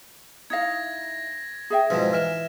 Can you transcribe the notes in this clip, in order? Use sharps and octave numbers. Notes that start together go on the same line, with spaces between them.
D#4 E4 F5 G#6 A#6
G#4 E5 G5
G#2 B2 F3 D#4 E4
E3 F6 E7